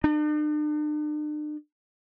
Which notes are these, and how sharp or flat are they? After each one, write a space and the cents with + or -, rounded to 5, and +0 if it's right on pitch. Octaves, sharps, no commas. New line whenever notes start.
D4 +45